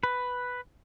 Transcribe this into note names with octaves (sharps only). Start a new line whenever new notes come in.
B4